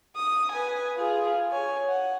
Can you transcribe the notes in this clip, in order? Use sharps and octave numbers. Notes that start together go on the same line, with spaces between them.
D#6
B4 G#5
F4 G#4
C#5 G#5
F#5